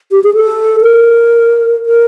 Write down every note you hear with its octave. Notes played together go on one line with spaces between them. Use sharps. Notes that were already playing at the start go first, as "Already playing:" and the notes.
G4
G#4
A4
A#4
A#4